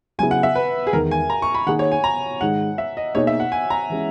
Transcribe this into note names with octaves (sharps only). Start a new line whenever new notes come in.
C#3 F#3 B3 E4 G#4 G#5
F#5
E5
B4
G#4
E2 D#3 G#3 A#4
G#5
A#5
C#6
B5
D#3 A#3 D#4 G#4 F#5
C#5
G#5
A#5
G#2 D#3 G#3 D#4 F#5
E5
D#5
B2 A#3 D#4 G#4 C#5 D#5
E5
F#5
G#5
A#5
E3 G#3 C#4